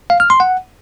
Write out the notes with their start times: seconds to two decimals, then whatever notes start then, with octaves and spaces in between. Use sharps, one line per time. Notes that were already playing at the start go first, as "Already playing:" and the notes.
0.10 F5
0.20 F6
0.30 C6
0.40 F#5